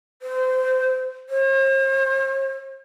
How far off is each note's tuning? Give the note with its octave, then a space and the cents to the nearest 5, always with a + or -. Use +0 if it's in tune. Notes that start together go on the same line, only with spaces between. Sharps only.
C5 -25
C5 +45